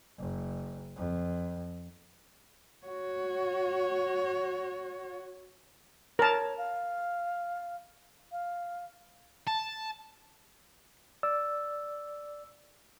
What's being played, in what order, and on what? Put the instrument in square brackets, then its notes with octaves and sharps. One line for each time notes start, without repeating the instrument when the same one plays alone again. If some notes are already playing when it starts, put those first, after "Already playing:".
[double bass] F#1
F2
[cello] F#4 C#5
[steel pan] A#4 A5 [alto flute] C#5
[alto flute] F5
F5
[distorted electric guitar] A5
[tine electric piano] D5 [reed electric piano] E6